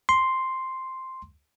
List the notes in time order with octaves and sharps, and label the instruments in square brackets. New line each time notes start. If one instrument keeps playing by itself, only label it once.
[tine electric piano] C6